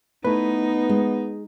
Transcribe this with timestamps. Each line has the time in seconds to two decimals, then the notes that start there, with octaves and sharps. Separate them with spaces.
0.24 A3 B3 D#4 E4 B4
0.89 G#3